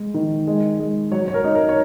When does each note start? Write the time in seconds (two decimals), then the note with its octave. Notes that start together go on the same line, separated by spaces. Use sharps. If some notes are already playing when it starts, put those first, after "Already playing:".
Already playing: G#3
0.14 D#3
0.47 G#3
0.80 G#3
1.11 F#3 C#5
1.28 C#5
1.34 A#4
1.44 D#4
1.55 A#4
1.69 C#5